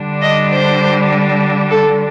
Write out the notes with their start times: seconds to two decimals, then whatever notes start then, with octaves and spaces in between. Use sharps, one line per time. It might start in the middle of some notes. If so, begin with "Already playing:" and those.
Already playing: D3 G3 D4
0.21 D#5
0.50 C5
1.70 A4